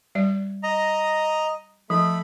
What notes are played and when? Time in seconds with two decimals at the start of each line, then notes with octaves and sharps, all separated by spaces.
0.15 G3 D5
0.63 D#5 A#5
1.90 F3 A3 B5